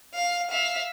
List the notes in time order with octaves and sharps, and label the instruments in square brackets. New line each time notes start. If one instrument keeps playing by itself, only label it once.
[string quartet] F5
E5 F5